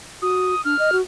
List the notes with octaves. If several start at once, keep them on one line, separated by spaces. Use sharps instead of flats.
F#4 D#6
D4 F6
D#5
F#4